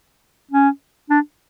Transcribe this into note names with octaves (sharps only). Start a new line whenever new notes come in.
C#4
D4